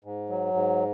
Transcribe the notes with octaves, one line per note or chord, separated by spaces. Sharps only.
G#2
F#3
G#2